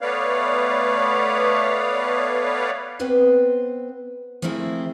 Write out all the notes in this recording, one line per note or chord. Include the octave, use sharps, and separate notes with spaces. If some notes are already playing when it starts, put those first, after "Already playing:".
A3 B3 B4 C#5 D5 F5
B3 C4 B4 C5
F3 A3 A#3 C4 E4 G#4